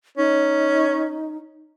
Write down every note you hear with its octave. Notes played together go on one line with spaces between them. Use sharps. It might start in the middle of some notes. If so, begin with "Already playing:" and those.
C#4 D#4